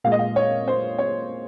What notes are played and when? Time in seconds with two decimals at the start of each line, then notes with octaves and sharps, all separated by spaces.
0.04 A#2 G#3 F5
0.12 D#5
0.19 F5
0.36 C#5
0.68 C5
0.98 C#5